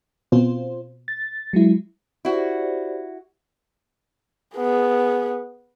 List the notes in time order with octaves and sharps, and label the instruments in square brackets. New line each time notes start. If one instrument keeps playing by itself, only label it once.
[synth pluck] B2 [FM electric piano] C4 F4 C5
[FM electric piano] A6
F#3 G#3 E4
[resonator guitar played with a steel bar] E4 F#4 [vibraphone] G4 C5 D5
[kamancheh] B3 G#4